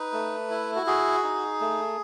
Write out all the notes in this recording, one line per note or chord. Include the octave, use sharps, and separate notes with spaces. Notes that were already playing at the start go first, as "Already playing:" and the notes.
Already playing: D#4 B4
A3
E4
F#4
F#4 G#4
D#4
A3